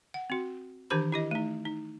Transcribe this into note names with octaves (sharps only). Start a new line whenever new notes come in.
F#5
C4 F#4
D#3 E3 D4 G4 C5 B5
E4 G4 D#5
A3 D#4
D#4